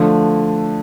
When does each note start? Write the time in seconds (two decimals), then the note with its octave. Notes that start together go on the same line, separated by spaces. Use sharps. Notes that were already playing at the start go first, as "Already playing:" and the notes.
Already playing: D3 F3 A3